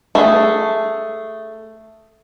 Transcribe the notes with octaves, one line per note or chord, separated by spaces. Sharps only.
A3 G#4